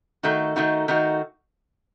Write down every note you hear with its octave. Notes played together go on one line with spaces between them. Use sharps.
D#3 A3 D#4 F#4
D#3 A3 D#4 F#4
D#3 A3 D#4 F#4